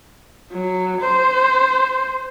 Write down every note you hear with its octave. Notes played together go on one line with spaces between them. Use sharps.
F#3
C5